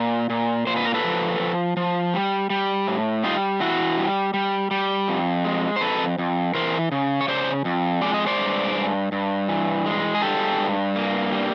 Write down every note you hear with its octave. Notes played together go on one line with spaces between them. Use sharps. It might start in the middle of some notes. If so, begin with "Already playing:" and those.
Already playing: A#2
A#2
A#2 C5
B4
A#4
A4 B4
F3
F3
F3
G3
G3
A2
G3 D#4 F4
E3 E4 F#4
G3
G3
G3
F2
G#3
C5
F2 A4 B4
F2
E3 A#4 C5
C#3
C#5
C#3 C5 D5
F2
G#3 D5
D#5
C5 D5
G2
G2
G2
E3
G#3
G#4
G2 G4 A4
G2
A#3
G3